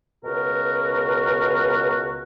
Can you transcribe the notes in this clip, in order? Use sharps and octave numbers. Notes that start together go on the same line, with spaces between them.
C#2 B2 F#4 A#4